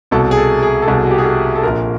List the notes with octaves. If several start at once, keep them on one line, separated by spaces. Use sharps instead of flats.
C2 B2 A4
G#4
A4
G#4
A4
C2 B2 G#4
F#4
G4
G#4
A4
A4
A#1 A#2 A#4